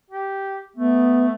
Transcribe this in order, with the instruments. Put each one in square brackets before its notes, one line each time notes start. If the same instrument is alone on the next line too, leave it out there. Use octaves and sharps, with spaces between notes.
[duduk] G4
[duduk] A3 [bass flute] B3